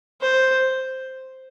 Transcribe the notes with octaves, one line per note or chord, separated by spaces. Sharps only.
C5